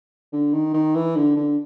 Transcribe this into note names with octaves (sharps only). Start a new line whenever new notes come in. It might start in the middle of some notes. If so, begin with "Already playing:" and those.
D3
D#3
D#3
E3
D3
D3